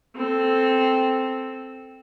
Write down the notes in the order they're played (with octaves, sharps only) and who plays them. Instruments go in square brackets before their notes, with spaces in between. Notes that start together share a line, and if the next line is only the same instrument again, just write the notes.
[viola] C4 A4